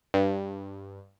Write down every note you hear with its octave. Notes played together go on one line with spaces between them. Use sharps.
G2